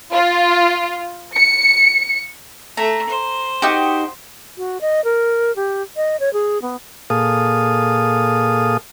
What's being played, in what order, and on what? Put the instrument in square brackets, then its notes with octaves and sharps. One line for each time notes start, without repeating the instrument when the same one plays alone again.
[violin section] F4
C#7
[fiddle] A3 [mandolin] A#5
[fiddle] C5
[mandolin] D#4 F#4 G4
[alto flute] F#4
D#5
A#4
G4
D#5
C#5
G#4
B3
[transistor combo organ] A#2 G#4 A4 F5 D#6